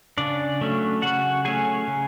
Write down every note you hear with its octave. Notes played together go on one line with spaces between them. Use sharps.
C#3 D4 D5
F#3 A3 C#4
C#3 F#4 F#5
F#3 A3 C#4 G#4 G#5
C#3